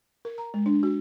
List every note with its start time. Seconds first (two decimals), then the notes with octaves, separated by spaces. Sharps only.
0.25 A#4
0.38 A#5
0.54 G#3
0.66 D4
0.83 F#4